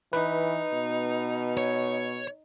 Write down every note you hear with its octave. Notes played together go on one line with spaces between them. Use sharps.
E3 D#4 B4
B2
C#5